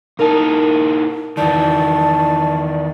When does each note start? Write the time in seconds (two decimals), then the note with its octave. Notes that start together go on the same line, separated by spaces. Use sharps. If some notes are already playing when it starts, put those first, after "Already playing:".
0.19 A#2 D#4 E4 A#4 A5
1.37 E2 D#3 E4 D5 A5 G6